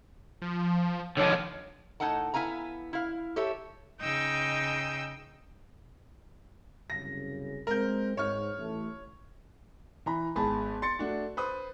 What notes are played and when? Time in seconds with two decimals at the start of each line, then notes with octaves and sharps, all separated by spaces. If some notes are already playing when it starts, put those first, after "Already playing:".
0.42 F3
1.17 D3 D#3 F3 C#5
2.00 A2 D#4 A4 F#5 A5
2.34 B3 E4 F5 G#5 A#5
2.93 E4 F5
3.36 G4 A4 C#5 E5
4.01 C#3 D#4 G5 E6 G6
6.90 C2 F#2 C#3 A#6
7.67 G#3 C4 A#4 G6
8.17 G#2 C#5 F6
8.57 A1 A3
10.06 E3 A#5 B5
10.36 G#1 B3 G#4 A5 B5
10.82 C6 A6 C#7
10.99 A3 D4 F#4
11.37 B4 C5 D#6